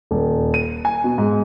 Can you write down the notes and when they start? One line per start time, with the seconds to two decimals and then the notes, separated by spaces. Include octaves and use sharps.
0.11 D#1
0.54 D#7
0.85 G#5
1.04 B2
1.18 G#2